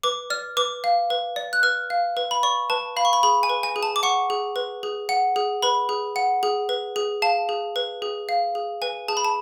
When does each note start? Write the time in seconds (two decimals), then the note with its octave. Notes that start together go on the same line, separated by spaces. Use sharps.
0.03 B4 D6
0.30 D5 F6
0.57 B4 D6
0.84 F5
1.10 B4
1.36 D5
1.53 F#6
1.63 B4 F6
1.90 F5
2.17 B4
2.31 B5
2.43 D5 C#6
2.70 B4 A5
2.97 F5 B5
3.05 C#6
3.13 B5
3.23 G#4 B5
3.43 G#5
3.50 B4
3.63 G#5
3.76 G#4
3.83 A5
3.96 D6
4.03 F#5 C#6
4.30 G#4
4.56 B4
4.83 G#4
5.09 F#5
5.36 G#4
5.63 B4 B5
5.89 G#4
6.16 F#5
6.43 G#4
6.69 B4
6.96 G#4
7.22 F5 A5
7.49 G#4
7.76 B4
8.02 G#4
8.29 F5
8.55 G#4
8.82 B4 G#5
9.08 G#4 A5
9.17 B5
9.25 A5